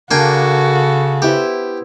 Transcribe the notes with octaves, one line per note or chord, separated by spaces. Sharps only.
C#3 A#3 D4 F#4 A4 G5 G#5
B3 E4 G4 C5